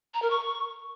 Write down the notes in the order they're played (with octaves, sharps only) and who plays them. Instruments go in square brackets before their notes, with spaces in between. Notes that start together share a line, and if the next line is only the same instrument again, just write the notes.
[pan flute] A#5
A#4
C#6